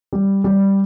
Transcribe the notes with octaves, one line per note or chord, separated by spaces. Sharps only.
G3
G3